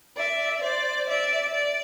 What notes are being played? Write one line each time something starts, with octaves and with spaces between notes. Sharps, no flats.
D5 E5
C5 D5
D5 E5
D5